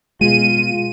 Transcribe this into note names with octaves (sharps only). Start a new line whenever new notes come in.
B2 G#3 F4 D#7